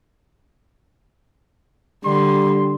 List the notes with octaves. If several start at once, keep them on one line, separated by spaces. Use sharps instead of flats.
D3 G3 C6